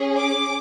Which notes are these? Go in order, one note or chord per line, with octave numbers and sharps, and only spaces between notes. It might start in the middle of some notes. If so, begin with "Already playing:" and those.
Already playing: C#4 G#4
D6